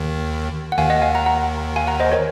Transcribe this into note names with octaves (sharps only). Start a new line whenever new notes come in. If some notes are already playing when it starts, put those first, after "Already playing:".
Already playing: D#2 D#3
F#5
D#2 D#3 F5 G#5
D#5 F#5
F5 G#5
F#5 A#5
F#5 A#5
F5 G#5
F#5 A#5
C5 D#5
A#4 C#5